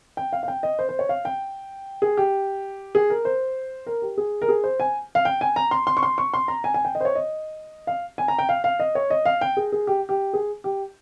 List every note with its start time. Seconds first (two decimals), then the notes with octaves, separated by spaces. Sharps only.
0.17 G5
0.33 F5
0.43 F5
0.48 G5
0.63 D#5
0.79 C5
0.89 C5
0.99 C#5
1.09 F5
1.25 G5
2.02 G#4
2.17 G4
2.95 G#4
3.10 A#4
3.25 C5
3.87 A#4
4.02 G4
4.18 G#4
4.42 A#4
4.49 G#4
4.64 C5
4.80 G#5
5.15 F5
5.25 G5
5.41 G#5
5.56 A#5
5.71 C6
5.87 C6
5.97 C#6
6.03 C6
6.18 C#6
6.34 C6
6.48 A#5
6.64 G#5
6.74 G#5
6.85 G5
6.95 D#5
7.01 C5
7.05 C#5
7.15 D#5
7.87 F5
8.18 G#5
8.28 A#5
8.39 G5
8.49 F5
8.64 F5
8.80 D#5
8.95 C#5
9.10 D#5
9.26 F5
9.41 G5
9.57 G#4
9.72 G#4
9.87 G4
10.09 G4
10.33 G#4
10.64 G4